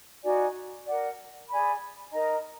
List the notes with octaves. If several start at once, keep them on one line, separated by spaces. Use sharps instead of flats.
D#4 F#4 D5 G#5
A#4 D5 F#5
G#4 D5 G#5 B5
D#4 A#4 D#5 A#5